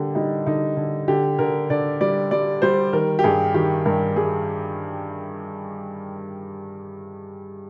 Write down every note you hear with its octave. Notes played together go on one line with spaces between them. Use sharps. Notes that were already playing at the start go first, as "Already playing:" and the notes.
Already playing: D3 G3 A#3 G4
G3 D#4
D3 D#4
D3
D3 G4
D3 A#4
D3 D5
G3 D5
G3 D5
G3 C5
D#3 A#4
G4
G2 G#4
D#3 G4
G2 A#4
G3 G#4